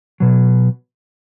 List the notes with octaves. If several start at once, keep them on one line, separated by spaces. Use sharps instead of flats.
B2 F#3